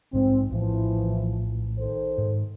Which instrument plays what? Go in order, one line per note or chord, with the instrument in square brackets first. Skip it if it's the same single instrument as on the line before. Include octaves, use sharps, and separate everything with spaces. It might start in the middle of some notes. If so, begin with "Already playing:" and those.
[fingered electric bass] A#1 G#2 G#3 [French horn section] C4
[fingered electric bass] A#1 A2 [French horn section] E3 F3
[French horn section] D#3 A4 C5
[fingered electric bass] G#2